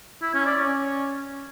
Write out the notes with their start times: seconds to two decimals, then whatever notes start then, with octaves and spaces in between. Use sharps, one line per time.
0.22 E4
0.34 C#4
0.46 D5
0.58 C#4